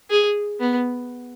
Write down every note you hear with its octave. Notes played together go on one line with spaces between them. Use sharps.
G#4
B3